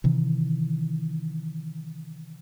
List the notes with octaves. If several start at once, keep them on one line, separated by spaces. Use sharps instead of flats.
C3 D#3 E3